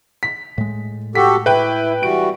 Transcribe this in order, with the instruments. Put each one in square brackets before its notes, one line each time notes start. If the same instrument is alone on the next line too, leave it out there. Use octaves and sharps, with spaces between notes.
[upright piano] B6
[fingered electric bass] A2 G#3
[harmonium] F#4 G4 A4 [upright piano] B6
[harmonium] E4 [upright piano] B4 G5
[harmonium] E3 G3 F#4 [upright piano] D7